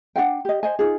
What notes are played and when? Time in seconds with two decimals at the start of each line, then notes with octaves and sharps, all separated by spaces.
0.16 D4 F4 F#5 G5
0.45 G4 D#5
0.63 C5 D#5 G#5
0.79 D#4 F4 G#4